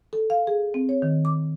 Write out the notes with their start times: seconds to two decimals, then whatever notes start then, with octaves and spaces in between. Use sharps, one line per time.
0.13 A4
0.30 F5
0.47 G#4
0.74 C4
0.89 C#5
1.02 D#3
1.25 D6